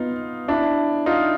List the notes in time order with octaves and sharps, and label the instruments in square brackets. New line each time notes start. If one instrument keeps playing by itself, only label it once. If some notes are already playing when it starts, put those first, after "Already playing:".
Already playing: [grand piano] B3 [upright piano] D#4 F4
[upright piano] D4 E4
D#4 F4